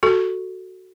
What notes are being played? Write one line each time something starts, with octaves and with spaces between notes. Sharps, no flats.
F#4 A4